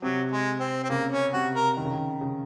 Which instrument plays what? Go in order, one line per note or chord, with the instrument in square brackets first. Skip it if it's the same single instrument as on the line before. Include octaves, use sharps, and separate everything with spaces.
[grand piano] C3 [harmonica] F#3
[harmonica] G#3
C4
C4
[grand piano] C#3 [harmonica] A#3
[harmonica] C#4
[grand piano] C3 [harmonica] F#4
[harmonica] A#4
[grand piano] D#3
C#3
D#3
C#3